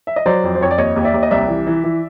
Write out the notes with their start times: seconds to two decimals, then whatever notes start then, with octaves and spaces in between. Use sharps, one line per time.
0.07 E5
0.16 D#5
0.26 F#3 C5 D5
0.43 F2
0.55 C5
0.61 F2 C#5
0.71 D5
0.78 D#2 C#5 D#5
0.96 D#2
1.05 D5 E5
1.14 D#2
1.23 D#5
1.31 C2 D5 E5
1.48 E3
1.67 E3
1.84 E3